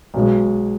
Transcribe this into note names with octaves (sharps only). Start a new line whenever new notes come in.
B1 B2 G#3